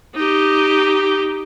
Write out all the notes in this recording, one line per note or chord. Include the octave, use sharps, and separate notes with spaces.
D#4 G4